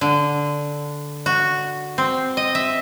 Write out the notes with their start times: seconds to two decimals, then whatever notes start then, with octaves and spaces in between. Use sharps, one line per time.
0.01 D3
1.26 F#4
1.98 C4
2.37 D#5
2.55 E5